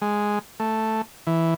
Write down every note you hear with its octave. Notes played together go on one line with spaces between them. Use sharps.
G#3
A3
E3